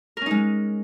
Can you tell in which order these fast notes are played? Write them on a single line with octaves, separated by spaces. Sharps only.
A#4 C#4 D#4 G#3